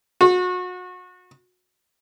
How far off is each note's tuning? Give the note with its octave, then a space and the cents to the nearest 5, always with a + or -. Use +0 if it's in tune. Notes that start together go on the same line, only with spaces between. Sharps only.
F#4 -35